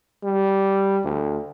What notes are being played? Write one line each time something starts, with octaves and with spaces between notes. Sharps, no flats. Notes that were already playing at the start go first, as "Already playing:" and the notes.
G3
D2